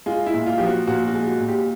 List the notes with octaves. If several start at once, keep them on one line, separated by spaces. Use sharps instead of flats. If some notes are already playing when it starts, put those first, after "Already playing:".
G#3 F4
E4
A#2
F4
F3 G4
F#4
A#2 F#4
F#4
G#3
F#4
A#2
G4